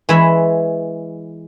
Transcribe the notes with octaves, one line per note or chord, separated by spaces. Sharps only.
E3 G#3 C#5 E5 B5